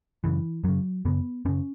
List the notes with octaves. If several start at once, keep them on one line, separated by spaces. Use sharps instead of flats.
F#2 C#3 E3
F#2 C#3 F#3
F#2 C#3 B3
F#2 C#3 C#4